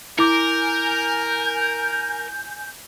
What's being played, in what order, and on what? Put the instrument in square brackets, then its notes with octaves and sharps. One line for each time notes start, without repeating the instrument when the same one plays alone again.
[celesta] E4 D6 [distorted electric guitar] A#4 [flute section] G#5 G6